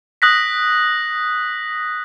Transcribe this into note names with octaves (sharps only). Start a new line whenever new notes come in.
D#6 F#6 A#6 B6